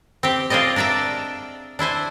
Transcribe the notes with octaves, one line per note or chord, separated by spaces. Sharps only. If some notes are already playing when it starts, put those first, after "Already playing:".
C4 G4
F4 G#4 C5 D5 D#5
D4 A#4 D5 E5 A#5
D4 E4 C5 G#5